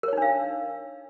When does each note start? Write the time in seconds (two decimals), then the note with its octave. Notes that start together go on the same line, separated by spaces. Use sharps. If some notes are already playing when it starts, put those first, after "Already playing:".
0.03 A#4
0.08 C#5
0.13 D#4
0.17 D4
0.22 F5